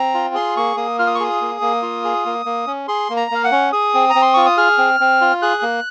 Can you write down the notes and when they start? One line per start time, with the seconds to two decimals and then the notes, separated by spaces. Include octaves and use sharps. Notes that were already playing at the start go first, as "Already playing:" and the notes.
Already playing: C4 A#5
0.14 F4
0.34 G#4 C6
0.57 A#3 C#6
0.77 A#3 D#6
0.99 F4 F6
1.07 D#6
1.15 C#6
1.20 G#4 D#6
1.41 A#3
1.61 A#3
1.82 F4
2.04 G#4
2.26 A#3
2.46 A#3
2.67 C#4
2.88 G#4 C6
3.10 A#3
3.16 A#5
3.31 A#3 F5
3.44 F#5
3.52 C#4
3.73 G#4 D#6
3.94 C4
4.10 A#5
4.15 C4
4.22 C6
4.34 F4 C#6
4.46 D#6
4.57 G#4 F6
4.78 C4
5.00 C4
5.21 F4
5.42 G#4 F#6
5.62 A#3